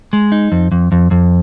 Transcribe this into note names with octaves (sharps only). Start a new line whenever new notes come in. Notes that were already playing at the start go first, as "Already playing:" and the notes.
G#3
D#4
F2
F2
F2
F2